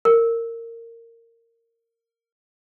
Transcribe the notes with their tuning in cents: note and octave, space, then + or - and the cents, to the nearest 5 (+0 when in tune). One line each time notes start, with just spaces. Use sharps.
A#4 -20